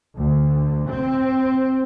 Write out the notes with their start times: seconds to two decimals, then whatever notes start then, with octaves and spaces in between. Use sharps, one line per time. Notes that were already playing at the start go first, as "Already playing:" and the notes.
0.16 D2
0.87 C4